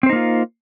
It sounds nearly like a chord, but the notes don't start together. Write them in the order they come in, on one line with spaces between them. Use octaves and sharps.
C4 C5 D#4 A#3 F4